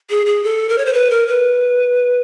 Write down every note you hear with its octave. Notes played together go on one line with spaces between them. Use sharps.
G#4
G#4
A4
A#4
C#5
C5
B4
A#4
B4